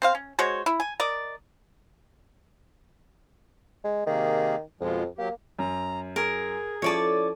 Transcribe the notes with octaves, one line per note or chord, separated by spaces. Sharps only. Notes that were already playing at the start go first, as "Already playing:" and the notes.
C4 C5 F5
C#4
G#3 F#4 C5 C#5
E4
G#5
A#4 D5 D#5
G#3
C3 D#3 A#3 G#4
F2 B2 F3 G#3
F#3 A#3 G4
F#2 A#5
G#4 A#4
F3 C#4 E4 A4 C#5 D5 A5 D#7